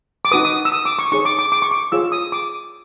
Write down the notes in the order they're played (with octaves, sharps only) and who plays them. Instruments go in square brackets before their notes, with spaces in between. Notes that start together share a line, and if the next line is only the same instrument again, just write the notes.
[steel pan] D6
D#4 F#4 B4 D#6
D#6
E6
D#6
D6
C#6
D#4 G#4 C#5 C#6
D6
D6
D6
C#6
D6
F4 G#4 C#5 E6
D#6
D6